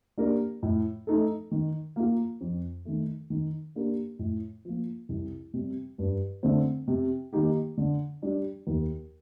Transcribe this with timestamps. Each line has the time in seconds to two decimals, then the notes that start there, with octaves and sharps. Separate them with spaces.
0.18 A#3 D4 G4 A#4
0.63 A2
1.07 A3 D#4 A4
1.51 D#3
1.96 A#3 F4
2.41 F2
2.85 D#3 A3
3.30 D#3
3.75 A#3 D4 G4 A#4
4.19 A2
4.65 F3 A#3
5.09 C2
5.53 C3 G3
5.98 G2
6.43 D3 A3 C4
6.87 C3
7.33 D#3 A#3 D#4 G4
7.77 D3
8.22 G3 D4
8.67 D#2